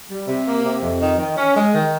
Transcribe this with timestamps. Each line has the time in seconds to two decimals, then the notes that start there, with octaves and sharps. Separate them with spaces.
0.10 G3
0.28 C3
0.46 A#3
0.65 C3
0.83 F2
1.01 D#3
1.18 D#3
1.37 C#4
1.56 G#3
1.74 D#3